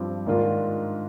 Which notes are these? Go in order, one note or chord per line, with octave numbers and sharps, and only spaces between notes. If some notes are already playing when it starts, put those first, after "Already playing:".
Already playing: G2 F3 C4 G4
G#2 D#3 A#3 D4 F4